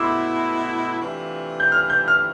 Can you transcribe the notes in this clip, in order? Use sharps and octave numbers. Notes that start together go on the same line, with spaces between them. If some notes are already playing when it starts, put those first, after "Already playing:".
Already playing: B2 A3 E4 C6 D6 E6
C3 E3 A3 D4 F4
G6
F6
G6
F6